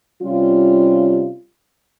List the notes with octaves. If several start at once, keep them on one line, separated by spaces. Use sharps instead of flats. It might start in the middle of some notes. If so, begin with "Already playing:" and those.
C3 G3 C#4 F4